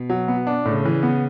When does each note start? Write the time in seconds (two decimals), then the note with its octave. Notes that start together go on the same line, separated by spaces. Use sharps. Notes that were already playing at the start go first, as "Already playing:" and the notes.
Already playing: B2
0.10 F#3
0.28 B3
0.47 D4
0.65 A2 C#3
0.85 E3
1.03 B3